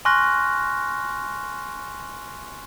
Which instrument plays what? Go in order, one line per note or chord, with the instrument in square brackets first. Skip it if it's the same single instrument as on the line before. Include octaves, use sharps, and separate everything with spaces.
[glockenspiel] G#5 C6 C#6 F6 F#6 A#6